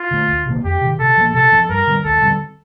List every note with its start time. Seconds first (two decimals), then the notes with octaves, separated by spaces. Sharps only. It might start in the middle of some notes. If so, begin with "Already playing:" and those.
Already playing: F4
0.11 D3 A3
0.28 D2
0.46 C3 D#3 A#3
0.64 F2 G4
0.81 C3 D#3
0.99 C3 A4
1.17 F3 A#3
1.34 C3 A4
1.52 F3 C4
1.69 G2 A#4
1.87 D3 G3 C4
2.04 D2 A4
2.22 D3 G3 C4